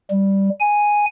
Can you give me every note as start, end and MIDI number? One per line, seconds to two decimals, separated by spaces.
0.10 0.50 55
0.60 1.05 80